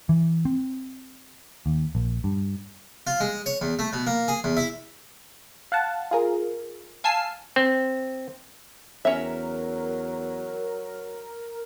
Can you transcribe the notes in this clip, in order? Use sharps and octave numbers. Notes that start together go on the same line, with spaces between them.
E3
C4
D#2
A#1
G2
F4
G#3
C#5
E2
A3
B2
A#3
G#4
E2
E4
F5 F#5 A5
F4 G#4 A#4
F5 G#5 A5 E6 C7
C4
E2 F#3 C#4 A#4 E5